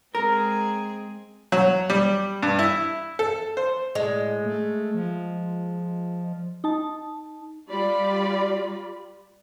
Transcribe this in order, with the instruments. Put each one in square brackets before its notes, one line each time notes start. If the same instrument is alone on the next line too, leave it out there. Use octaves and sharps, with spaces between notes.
[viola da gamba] G#3 C4 G#4 [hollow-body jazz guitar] A#4
[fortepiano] F#3
G3
G2
E4
A4
C5
[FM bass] A2 [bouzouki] G#3
[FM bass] A3
F3
[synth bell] D#4 A5
[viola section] G3 F4 D5 B5